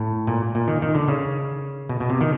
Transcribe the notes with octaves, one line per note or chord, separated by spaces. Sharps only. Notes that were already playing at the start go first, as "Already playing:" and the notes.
Already playing: A2
A#2
A#2
D#3
D#3
D3
C#3
B2
B2
C3
D#3